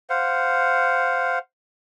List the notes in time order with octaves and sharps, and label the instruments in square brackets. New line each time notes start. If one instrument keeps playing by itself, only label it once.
[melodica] C5 F5 F#5